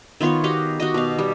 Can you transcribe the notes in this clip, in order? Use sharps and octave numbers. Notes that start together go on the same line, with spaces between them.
D#3 B3 F4 C#5
F#4 G4 D#5 F5
F#4 G4 D#5
B2 F5
G3